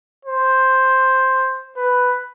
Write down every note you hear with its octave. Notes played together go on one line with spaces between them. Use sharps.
C5
B4